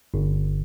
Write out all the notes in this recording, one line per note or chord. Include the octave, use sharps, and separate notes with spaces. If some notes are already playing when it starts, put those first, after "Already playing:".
G1